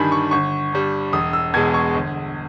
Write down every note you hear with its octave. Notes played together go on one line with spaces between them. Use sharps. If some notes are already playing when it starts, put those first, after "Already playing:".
Already playing: G1 G2 D#3 G3 G#5 B5
C#6
G1 C#6
G2 G3
E1 D#6
E6
E2 B2 G#3 G#6
C#6
G1